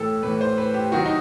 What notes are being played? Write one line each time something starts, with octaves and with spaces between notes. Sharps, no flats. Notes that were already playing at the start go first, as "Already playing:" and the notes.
Already playing: A2 E3 G4 A4
A2 E3 B4
C5
B4
G4
C3 D#3 F#3 F#4
D#4